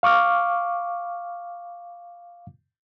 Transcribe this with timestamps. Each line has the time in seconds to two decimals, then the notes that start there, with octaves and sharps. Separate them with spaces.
0.03 F5 C#6 D6 F6